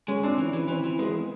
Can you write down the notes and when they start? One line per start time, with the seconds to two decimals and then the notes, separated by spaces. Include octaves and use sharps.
0.08 G#3 C#4
0.23 C4 D4
0.38 E3 C#4
0.53 E3
0.68 E3 C4
0.84 E3
0.99 G#3 B3